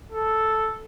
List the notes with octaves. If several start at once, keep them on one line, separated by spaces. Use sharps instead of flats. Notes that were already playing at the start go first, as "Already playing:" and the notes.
A4